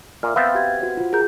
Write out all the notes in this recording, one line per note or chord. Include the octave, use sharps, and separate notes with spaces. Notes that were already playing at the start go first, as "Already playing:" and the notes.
A#2 E5 F6
B3 C4 E5 F5 G6 A6
F#4 G4 G#6
F#4 C5 F#5
F4
G#4 A#4 G6